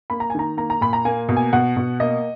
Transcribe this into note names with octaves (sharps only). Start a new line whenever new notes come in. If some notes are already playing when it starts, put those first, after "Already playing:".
A#3 B5
A#5
G#5
D#3 A#5
A#3 A#5
A#5
A#2 B5
A#5
A#3 G#5
B2
G#5
B2 F#5
B2
A#3 D#5